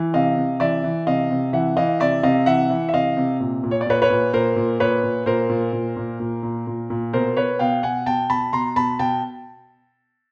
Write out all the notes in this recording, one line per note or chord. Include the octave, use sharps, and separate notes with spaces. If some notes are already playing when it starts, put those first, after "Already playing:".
Already playing: E3
C3 D#5 F5
C3
E3 D5 E5
E3
C3 D#5 F5
C3
E3 E5 F#5
E3 D#5 F5
C3 D5 E5
C3 D#5 F5
E3 E5 F#5
E3
E5
C3 D#5 F5
C3
A#2
A#2
C#5
D5
A#2 B4 C#5
B4 C#5
A#2
A#2 A#4 C5
A#2
A#2 B4 C#5
A#2
A#2 A#4 C5
A#2
A#2
A#2
A#2
A#2
A#2
A#2
B2 A#4 C5
B2 B4 C#5
B2 F5 G5
B2 F#5 G#5
B2 G5 A5
B2 A5 B5
B2 A#5 C6
B2 A5 B5
B2 G5 A5